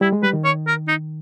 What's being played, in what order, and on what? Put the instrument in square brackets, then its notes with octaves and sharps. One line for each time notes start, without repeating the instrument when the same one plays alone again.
[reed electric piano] G3 [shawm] E4
[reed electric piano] G#3
[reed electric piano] G3 [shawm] B4
[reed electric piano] D#3
[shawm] C#5
A#4
D#4